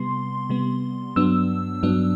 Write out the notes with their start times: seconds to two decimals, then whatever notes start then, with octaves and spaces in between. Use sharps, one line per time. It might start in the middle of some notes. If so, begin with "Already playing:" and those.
Already playing: C3 G3 B3 C6
0.49 C3 G3 B3
1.16 G2 F#3 B3 D4 E6
1.83 G2 F#3 B3 D4